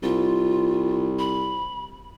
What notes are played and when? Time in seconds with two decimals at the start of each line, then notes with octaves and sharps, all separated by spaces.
0.03 C2 F4
1.19 B5